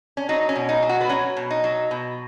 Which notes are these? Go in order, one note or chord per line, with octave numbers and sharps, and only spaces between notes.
C#4
F#3 D#4
C#4
B2
D#4
F#3
F#4
B3
F#3 C#4
B2
D#4
F#3
B2